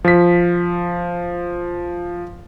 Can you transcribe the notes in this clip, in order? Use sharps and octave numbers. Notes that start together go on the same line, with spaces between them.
F3 B6